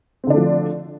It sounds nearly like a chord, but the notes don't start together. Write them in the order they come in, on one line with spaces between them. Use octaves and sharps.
C4 D3 D4 A3 F3